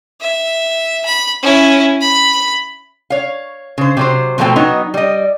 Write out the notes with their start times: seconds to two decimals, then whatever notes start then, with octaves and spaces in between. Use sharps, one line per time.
0.21 E5
1.05 B5
1.42 C#4 E4
2.01 B5
3.10 C#5 F5
3.78 C#3 C5
3.97 C3 F#3 C5
4.38 B2 F3 F#3 A3 C4 G5
4.56 F#3 B3 D#4 D#5
4.94 G3 D#5